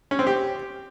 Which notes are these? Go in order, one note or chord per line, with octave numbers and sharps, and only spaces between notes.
C#4
C4
G4